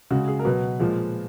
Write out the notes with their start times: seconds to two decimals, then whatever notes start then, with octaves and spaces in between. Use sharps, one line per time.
0.11 C#3 G#3 F#4
0.28 G#4
0.39 A#4
0.45 B2 F#3 B4
0.79 A#2 F3 G#3